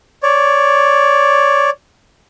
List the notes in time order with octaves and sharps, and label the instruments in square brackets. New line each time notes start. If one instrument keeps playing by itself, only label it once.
[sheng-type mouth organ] C#5 D5